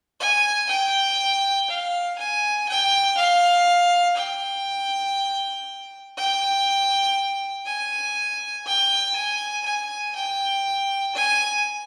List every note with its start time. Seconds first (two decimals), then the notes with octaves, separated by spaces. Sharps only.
0.20 G#5
0.69 G5
1.70 F5
2.18 G#5
2.69 G5
3.18 F5
4.17 G5
6.18 G5
7.66 G#5
8.66 G5
9.16 G#5
9.66 G#5
10.16 G5
11.15 G#5